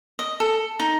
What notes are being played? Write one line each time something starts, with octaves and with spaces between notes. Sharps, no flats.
D#5
A4
D#4